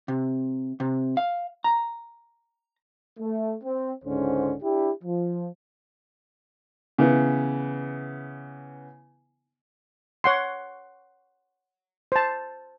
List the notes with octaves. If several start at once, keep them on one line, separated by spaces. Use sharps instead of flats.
C3
C3
F5
A#5
A3
C4
C#2 G#2 D3 C#4 C5
D4 E4 G4
F3
C#3 E3 B3
C#5 F#5 C6
C5 A5